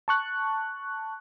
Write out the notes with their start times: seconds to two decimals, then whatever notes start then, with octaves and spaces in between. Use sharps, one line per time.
0.08 A5 C#6 F#6